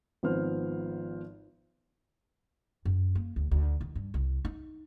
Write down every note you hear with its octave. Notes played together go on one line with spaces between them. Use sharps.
G#1 F3 B3 C5 F6
F#2
A#3
D2
D2
D#3
G2
C2
D#4